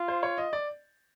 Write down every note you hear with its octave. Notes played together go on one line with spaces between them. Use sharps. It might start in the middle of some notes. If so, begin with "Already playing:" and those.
Already playing: F4
C5
C#5
D#5
D5